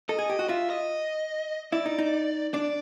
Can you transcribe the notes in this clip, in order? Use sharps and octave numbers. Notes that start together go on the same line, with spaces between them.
A4 D#5
G#4
G4
F#4
F4 E5
D#5
E4 D5
D#4
D#4
D4 D5